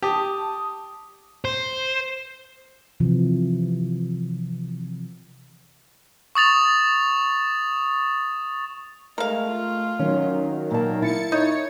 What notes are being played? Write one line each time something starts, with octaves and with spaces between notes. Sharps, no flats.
G4 A5 D#6
C5
C3 E3 F3
C#6 D#6 A6 F7
G#3 A3 A#4 F5
F4
D#3 F#3 C#4
A#2 A#3 A5
E4 A6 C#7
D#4 C#5